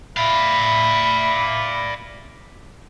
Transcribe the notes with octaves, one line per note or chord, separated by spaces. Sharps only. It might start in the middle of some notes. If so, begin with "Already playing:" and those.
D5 E5 F5 B5